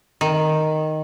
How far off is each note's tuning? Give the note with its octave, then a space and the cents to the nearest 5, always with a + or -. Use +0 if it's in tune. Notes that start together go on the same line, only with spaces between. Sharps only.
D#3 +0